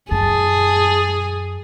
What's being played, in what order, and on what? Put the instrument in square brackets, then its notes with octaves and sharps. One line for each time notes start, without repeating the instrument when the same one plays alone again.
[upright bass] F#2 [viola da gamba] G#4 [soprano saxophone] A5